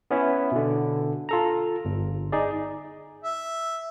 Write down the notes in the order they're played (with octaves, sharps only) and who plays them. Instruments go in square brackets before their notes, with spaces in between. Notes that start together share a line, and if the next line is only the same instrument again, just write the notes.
[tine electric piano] B3 C#4 E4 E5
B2 D3
F4 A4 A#5
G1
D#4 G#4 D5
[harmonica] E5